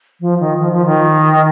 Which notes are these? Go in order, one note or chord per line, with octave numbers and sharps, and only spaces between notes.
F3
D#3
F3
F3
D#3